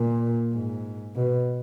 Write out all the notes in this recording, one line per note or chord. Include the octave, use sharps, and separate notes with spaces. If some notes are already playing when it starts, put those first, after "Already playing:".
Already playing: A#2
G#2
B2